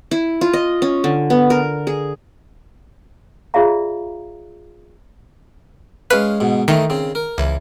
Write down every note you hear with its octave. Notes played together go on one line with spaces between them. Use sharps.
E4
F4
D#5
C#4
D3
B3
A#4
G#4
F4 G#4 D5 E5 F5 A#5
G#3 C#4 B4 F5
G#2 B2
D#3 E3 A3 D#4
C#3 C4
A#4
C#2 E3